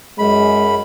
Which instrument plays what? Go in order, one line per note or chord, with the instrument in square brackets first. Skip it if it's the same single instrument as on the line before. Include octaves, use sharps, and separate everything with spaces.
[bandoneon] F#2 B5 [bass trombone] G#3